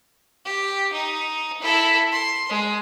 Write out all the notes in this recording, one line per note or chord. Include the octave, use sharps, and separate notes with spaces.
G4
D#4
E4 A4
C6
G#3